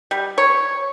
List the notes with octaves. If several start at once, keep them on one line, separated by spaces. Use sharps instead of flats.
G3
C#5